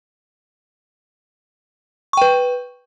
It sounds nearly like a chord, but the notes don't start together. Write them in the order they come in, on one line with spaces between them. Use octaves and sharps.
C#6 G5 B4